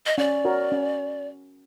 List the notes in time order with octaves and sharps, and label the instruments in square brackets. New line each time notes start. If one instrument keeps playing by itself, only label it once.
[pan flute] D#5
[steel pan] C#4 [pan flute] D5
[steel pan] F#4 A#4 C#5
C#4